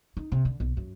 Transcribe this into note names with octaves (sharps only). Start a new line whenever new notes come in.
D#4
C3
D3
B1
F#2